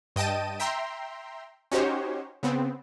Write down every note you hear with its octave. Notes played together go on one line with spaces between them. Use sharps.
G2 D#5 G5 A5 D#7
E5 G5 A#5 C6
C#4 D#4 F#4 G4 C5 C#5
C#3 B3 C4